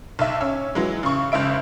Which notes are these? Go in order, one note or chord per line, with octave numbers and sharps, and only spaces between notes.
B1 E5
C#4 E6
E3 F#3 G#3
C#3 C#6
F#1 C#3 G#3 E5 D7